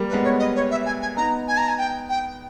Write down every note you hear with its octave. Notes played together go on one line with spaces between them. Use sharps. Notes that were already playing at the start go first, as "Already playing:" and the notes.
Already playing: G3 A#3
B4
G#3 B3
C#5
D#5
C#5
E5
G#5
G#5
B3 D#4 A#5
G#5
A#5
G#5
G5
G5